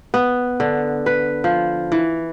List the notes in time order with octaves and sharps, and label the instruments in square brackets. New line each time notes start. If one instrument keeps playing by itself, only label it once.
[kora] B3
D3
B4
F3
E3